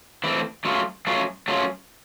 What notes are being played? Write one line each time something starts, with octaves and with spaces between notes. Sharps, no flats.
E3 A3 C4 E4
F#3 A3 C#4 F4
F#3 A3 C#4 F4
F#3 A3 C#4 F4